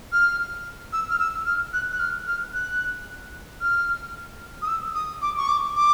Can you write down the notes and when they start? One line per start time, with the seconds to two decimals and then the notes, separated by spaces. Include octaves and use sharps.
0.12 F6
0.93 E6
1.10 F6
1.19 E6
1.46 F6
1.73 F#6
1.92 F#6
1.99 F6
2.27 F6
2.54 F#6
3.61 F6
4.62 D#6
4.68 E6
4.95 D#6
5.22 D6
5.37 C#6
5.48 D6
5.76 D6